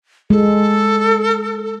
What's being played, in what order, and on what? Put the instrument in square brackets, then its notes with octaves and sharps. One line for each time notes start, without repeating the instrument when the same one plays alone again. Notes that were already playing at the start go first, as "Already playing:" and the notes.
[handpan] G#3 [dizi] A4